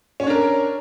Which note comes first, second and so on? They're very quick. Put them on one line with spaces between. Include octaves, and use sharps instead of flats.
C#4 C#5 D4 A#4